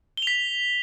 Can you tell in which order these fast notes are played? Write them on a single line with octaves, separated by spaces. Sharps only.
G7 F7 B6